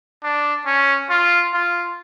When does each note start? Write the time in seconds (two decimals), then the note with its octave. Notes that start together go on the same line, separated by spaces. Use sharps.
0.23 D4
0.66 C#4
1.10 F4
1.54 F4